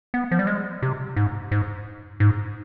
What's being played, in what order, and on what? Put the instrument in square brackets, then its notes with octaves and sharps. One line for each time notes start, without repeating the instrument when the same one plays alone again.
[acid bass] B3
F3
G3
G#3
C3
G#2
G#2
G#2